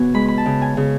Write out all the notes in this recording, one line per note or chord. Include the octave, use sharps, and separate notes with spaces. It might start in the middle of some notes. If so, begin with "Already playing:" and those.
Already playing: C#3 B3 F#4 G#5
G#3 B5
B5
A5
C#3
G#5
C#3